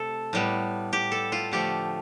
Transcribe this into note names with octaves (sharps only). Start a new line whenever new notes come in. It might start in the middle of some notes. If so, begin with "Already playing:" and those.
Already playing: C3 A3 A4
A2 G3 B3
G4
A4
F4
D3 F3 A3 G4